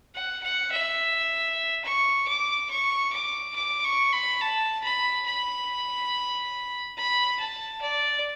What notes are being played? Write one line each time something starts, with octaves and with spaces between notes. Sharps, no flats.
F#5
F#5
E5
C#6
D6
C#6
D6
D6
C#6
B5
A5
B5
B5
B5
A5
D5